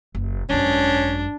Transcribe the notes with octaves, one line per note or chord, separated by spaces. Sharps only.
F#1
G#1 F#2 C#4 D4